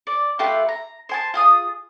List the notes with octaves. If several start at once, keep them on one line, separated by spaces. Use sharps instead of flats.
D5
A3 F4 G4 B4
A#5
C5 G#5 A5
F4 G#4 D#6